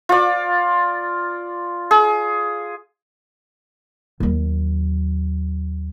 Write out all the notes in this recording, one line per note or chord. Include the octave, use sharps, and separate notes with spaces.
F4 D5
G#4
D#2 F#3